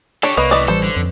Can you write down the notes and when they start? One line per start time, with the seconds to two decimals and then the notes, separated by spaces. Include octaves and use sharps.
0.23 D4 G4 A4 C#5
0.37 C2 A#3 B4 D#5
0.51 A2 E3 D5 D#5
0.68 A1 E3 G3 A4 C5
0.83 D3
0.96 F2 F3